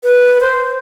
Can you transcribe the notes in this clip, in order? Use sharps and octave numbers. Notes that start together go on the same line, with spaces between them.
B4
C5